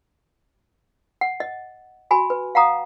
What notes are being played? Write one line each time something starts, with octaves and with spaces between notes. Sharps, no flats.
F#5
D#5
F#4 G#5 B5
B4
F5 F#5 A#5 D#6